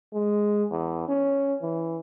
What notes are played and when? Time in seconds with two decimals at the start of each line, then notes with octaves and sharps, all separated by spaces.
0.13 G#3
0.71 E2
1.08 C#4
1.62 E3